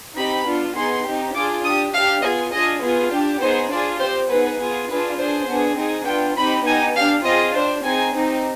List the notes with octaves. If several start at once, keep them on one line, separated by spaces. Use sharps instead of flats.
C4 D#4 G4 B5
B3 D4 F4
B3 D#4 G#4 C6
C4 D#4 G4
D4 F4 G#4 D6
D4 G4 D#6
D4 G4 F5
B3 F4 G#4 D#5
D4 F4 G#4 D#5
B3 F4 G#4
D4 G4
B3 D#4 G#4 C5
D4 F4 G#4 D5
C4 G4 C5
B3 D#4 G#4 B4
B3 F4 G#4
D4 F4 G#4 B4
D4 G#4 C5
B3 D4 G#4
C4 D#4 G#4
B3 D4 F4 G5
C4 D#4 G4 B5
B3 D#4 G4 G#5
D4 G4 F5
C4 F4 G#4 D#5
D4 G4 C5
C4 D#4 G#4 G#5
C4 D#4 G4